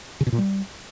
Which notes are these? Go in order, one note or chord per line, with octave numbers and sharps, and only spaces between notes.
C#3
B2
A#2
G3